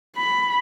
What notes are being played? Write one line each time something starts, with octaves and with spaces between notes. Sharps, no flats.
B5